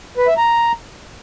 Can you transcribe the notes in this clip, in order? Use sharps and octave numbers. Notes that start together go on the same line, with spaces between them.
B4
E5
A#5